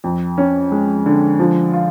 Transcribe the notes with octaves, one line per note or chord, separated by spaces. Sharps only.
F2
C#4
G#3
D3
F3
F4